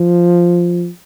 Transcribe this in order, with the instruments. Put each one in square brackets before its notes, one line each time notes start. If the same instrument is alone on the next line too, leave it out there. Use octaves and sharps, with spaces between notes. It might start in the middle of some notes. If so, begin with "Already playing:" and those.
Already playing: [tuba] F3